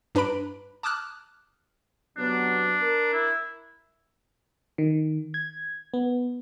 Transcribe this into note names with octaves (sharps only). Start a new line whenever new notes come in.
G2 D4 B4 A#5 B5 D7
A5 D6 D#6 F6 F#6
C3 F#3 B3 D4
A#4
E4
D#3
G#6
B3